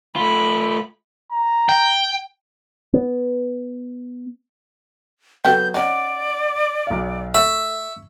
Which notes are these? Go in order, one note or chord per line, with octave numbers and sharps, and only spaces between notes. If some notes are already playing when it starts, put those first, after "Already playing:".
A3 F4 B5
A#5
G5
B3
F#3 B3 F#4 A4 B4 G5 G6
C#4 D#4 D5 F#5
B1 F5
A3 E5 C#6